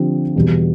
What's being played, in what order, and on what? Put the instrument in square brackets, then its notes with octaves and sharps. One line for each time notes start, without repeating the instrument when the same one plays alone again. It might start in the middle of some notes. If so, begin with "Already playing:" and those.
Already playing: [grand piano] D3 F3 C4 G4
E2 B2 G3